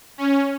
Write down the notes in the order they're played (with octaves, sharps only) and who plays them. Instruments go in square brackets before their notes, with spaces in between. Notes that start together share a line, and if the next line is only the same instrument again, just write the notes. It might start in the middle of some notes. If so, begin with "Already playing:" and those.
[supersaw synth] C#4